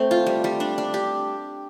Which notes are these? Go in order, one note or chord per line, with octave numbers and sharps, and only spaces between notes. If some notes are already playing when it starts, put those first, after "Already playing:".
Already playing: A3 C4 C5
F4
G3
G3
D4
D4
G4